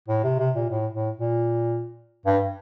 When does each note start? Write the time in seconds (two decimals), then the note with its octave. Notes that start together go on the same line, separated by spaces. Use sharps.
0.08 A2
0.24 C3
0.39 C3
0.55 A#2
0.70 A2
0.93 A2
1.17 A#2
2.26 G2